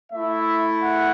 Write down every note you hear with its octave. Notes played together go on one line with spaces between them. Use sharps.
A3 E5
E4
F#5